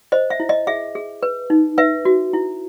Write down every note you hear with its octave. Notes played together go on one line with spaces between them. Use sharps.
C5 D#5
E5
E4
D#5
G#4 E5
G#4
B4
D#4
B4 E5
F#4
E4